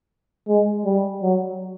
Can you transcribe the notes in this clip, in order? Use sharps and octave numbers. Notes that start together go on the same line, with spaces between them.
G#3
G3
F#3